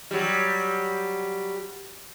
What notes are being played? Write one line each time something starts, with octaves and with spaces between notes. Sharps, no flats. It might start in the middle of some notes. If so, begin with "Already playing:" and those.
F#3 G3